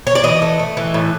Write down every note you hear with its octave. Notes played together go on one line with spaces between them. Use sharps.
C#5
D5
E3 D#5
A3
A3
E3
A2